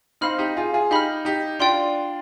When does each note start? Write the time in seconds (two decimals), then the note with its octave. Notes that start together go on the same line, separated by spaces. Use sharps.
0.21 C4 D#4 F5 B5 F6
0.38 D#4 G4
0.57 F4 G#4
0.73 F4 G#4
0.91 D#4 G4 F5 B5 F6
1.25 D#4 G4
1.59 D4 F4 D5 G5 C6